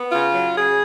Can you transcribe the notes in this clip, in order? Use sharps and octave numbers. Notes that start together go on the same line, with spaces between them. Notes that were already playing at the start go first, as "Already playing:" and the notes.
Already playing: B3
C#3 F4
F#3
C#3 G#4